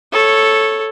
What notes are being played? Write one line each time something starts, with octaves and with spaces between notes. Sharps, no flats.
A4 C#5